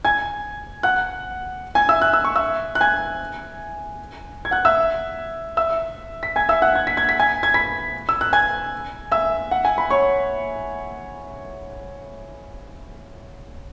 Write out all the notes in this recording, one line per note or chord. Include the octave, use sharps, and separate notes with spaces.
G#5 G#6
F#5 F#6
G#5 G#6
E5 E6
F#6
E6
C#6
E5 E6
F#6
G#5 G#6
G#6
F#5 F#6
E5 E6
E5 E6
B6
G#5 G#6
E5 E6
F#5 F#6
G#6
B6
G#6
B6
G#5 G#6
G#6
B5 B6
E6
F#6
G#5 G#6
E5 E6
F#5
G#5
B5
C#5 C#6